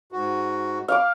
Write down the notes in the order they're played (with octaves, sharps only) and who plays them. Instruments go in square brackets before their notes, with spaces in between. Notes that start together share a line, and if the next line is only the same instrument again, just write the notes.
[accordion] G#2 F#4
[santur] F5 D6